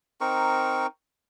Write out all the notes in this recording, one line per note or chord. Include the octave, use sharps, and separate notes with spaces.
C4 D#4 A#4 C#6